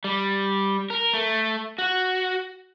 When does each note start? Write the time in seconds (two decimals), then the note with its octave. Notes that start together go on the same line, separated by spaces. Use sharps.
0.04 G3
0.90 A#4
1.13 A3
1.78 F#4